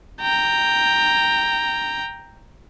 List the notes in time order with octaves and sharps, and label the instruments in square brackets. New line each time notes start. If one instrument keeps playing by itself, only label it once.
[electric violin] G5 A#5